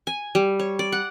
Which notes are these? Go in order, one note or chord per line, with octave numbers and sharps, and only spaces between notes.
G#5
G3
C#5
D5
F#5